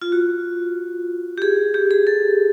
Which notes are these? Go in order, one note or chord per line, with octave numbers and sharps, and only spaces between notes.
F4
F#4
G4
G#4
G4
G#4
A4